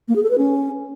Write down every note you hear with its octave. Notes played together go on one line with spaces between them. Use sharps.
A#3
G#4
A4
B4
C#4